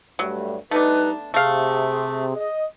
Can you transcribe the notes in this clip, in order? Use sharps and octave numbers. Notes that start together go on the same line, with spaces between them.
G2 F#3 G3 A3
G3 A3 B3 D4 D#4 B4
C3 A3 G#4 F5
D#5